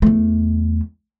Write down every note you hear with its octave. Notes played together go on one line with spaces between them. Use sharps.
E2 A3